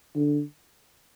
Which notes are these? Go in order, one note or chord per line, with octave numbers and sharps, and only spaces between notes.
D3